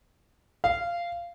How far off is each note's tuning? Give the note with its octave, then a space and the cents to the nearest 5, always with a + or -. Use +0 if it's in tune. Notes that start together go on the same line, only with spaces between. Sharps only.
F5 -15